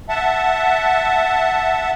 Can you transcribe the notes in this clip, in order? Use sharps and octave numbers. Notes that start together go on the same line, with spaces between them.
E5 F#5 A5